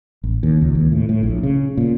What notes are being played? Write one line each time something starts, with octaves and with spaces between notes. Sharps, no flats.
A1
D#2
C#2
D#2
A2
A2
A#1
C#3
A#2